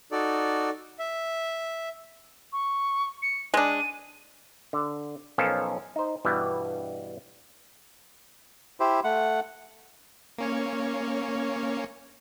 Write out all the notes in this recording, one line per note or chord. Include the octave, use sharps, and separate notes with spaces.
D#4 F#4 A4 D5
E5
C#6
C#7
G#3 D4 D#7
D3
B1 F3 C#4 F4 A4 A#4
D#4 C5
G2 B2 E3 G3 B3
E4 G4 C5
A3 F#5
A#3 C#4 C#5